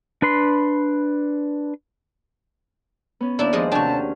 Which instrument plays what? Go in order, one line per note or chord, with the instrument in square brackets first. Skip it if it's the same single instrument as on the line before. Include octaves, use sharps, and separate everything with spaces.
[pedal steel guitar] D4 B4 B5 C6
[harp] B3 C#4
[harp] D#2 [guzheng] D4 E4 [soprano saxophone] D5
[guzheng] F3 G#3 D#5 [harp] G#4 C5
[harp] C3 F5 G5 [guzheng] D4 F#4 [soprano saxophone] A5
[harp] C#4